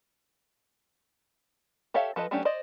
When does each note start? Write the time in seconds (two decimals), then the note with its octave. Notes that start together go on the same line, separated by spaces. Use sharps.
1.94 G4 A4 C#5 E5 F5
2.16 F3 A4 B4 D#5
2.31 F#3 A3 C#4 D4 G4
2.45 C5 D5 D#5